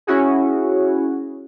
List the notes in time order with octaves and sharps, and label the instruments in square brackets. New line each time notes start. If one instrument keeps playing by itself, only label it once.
[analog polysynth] C#4 E4 F#4 G#4